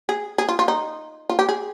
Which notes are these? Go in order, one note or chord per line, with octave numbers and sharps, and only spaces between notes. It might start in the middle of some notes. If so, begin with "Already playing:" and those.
G#4
G#4
F4
F4
D#4
F4
G4
G#4